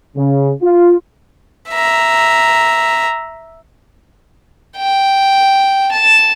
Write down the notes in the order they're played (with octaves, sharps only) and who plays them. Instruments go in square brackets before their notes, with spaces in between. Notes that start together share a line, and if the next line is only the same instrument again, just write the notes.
[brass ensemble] C#3
F4
[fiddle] E5 A#5
[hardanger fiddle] G5
A5